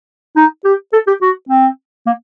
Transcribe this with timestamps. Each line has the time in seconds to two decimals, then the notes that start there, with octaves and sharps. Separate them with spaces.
0.36 D#4
0.65 G4
0.93 A4
1.07 G4
1.22 F#4
1.49 C4
2.06 A#3